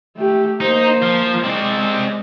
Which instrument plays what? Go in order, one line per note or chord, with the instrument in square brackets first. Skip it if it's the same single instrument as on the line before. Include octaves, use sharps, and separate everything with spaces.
[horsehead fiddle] A3 G4
[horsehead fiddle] A#3 C5 [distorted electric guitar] D#4
[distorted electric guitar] F3
[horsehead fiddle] G#3 [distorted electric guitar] C4 D5